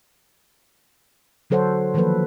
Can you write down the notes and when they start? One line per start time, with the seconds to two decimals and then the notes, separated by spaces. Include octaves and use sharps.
1.50 D3 F#3 A4 C5 C#5 F#5
1.94 D#3 F3 F#3 A#3 A4 B4